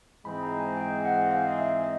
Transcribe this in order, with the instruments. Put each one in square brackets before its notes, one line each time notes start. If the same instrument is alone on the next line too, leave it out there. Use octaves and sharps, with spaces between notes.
[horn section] G#2 E3 G#3 C4 D#4 [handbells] B5
[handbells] A#5
G#5
G5
F#5
F5
E5
D#5